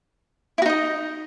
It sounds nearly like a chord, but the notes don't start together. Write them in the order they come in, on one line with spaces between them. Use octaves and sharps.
E4 F#4 D#4 D#5